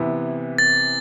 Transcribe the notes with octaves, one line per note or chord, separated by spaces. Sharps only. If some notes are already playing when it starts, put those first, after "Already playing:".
Already playing: C3 E3 B3 E4
A6